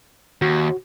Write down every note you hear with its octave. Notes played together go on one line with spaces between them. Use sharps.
D#2 F#4